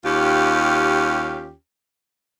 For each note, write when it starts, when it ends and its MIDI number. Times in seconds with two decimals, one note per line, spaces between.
0.05 1.53 39
0.05 1.53 61
0.05 1.53 65
0.05 1.53 67